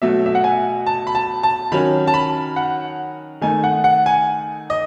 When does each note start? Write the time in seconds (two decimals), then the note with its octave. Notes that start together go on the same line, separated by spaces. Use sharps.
0.02 B2 F#3 A3 E5
0.26 E5
0.35 F#5
0.44 G#5
0.87 A5
1.07 B5
1.15 A5
1.43 A5
1.72 D#3 F#3 C#4 B5
2.07 A5
2.14 B5
2.56 F#5
3.41 D#3 A3 D#4 G#5
3.64 F#5
3.84 F#5
4.06 G#5
4.70 D#5